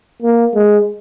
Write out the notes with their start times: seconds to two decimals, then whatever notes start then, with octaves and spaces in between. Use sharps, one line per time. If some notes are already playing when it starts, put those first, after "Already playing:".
0.22 A#3
0.55 G#3